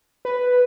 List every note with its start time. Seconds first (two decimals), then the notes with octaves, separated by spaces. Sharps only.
0.25 B4